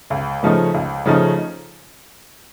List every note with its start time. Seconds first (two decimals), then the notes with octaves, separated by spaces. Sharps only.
0.10 C#2
0.43 C#3 F3 A3 D#4
0.74 C#2
1.06 C#3 F3 A3 D#4